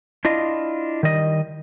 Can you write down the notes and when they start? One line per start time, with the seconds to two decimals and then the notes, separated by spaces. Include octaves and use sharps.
0.25 D4 E4 F4 D#5
1.03 D#3 G3 D#5